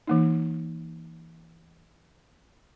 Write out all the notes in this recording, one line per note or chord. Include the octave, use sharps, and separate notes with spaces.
E3 A#3 D#4